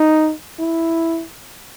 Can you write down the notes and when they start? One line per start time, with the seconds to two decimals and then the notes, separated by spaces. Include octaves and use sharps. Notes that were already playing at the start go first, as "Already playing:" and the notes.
Already playing: D#4
0.59 E4